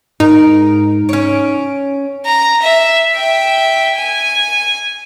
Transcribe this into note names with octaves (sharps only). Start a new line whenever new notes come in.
G#2 D#4 A#4
C#4 C#5 D7
A#5
E5
E5 G5
G#5